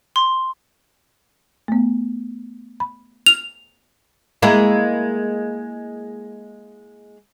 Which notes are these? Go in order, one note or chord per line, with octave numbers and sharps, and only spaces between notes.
C6
A3 B3
B5
F6 F7
G#3 A#3 E4